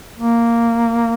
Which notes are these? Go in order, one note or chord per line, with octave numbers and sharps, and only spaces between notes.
A#3